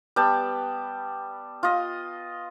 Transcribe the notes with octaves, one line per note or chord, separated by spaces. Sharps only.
G3 B3 G5 A5
F4 D#5